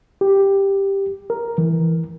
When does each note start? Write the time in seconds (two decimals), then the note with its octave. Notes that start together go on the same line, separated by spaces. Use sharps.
0.21 G4
1.30 A#4
1.58 E3